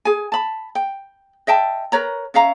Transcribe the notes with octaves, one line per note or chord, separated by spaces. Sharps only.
G#4 G#5
A5 B5
G5
D#5 E5 G5 A5
A#4 B4 C#5 A#5
C#4 E5 F5 A#5